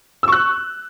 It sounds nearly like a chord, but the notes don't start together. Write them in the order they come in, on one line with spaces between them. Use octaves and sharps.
E6 C#6 F#6